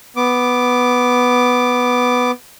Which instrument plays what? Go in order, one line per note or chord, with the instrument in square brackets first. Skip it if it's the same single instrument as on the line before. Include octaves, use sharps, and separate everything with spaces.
[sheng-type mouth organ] B3 D6